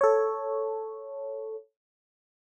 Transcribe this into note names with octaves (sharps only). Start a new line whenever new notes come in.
A4 C#5